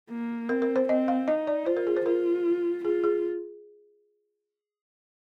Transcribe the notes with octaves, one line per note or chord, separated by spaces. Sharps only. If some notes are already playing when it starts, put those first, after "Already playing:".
A#3
C4 A#4
A#4
C5
C4 D#5
F5
D#4 D#5
D5
F4 C5
A#4
G#4
C5
F4 A#4
F4 G#4
G#4